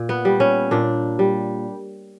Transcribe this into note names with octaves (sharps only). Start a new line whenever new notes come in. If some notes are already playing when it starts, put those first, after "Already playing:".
Already playing: A#2
B3
G3
C#4
A#2 D4
G3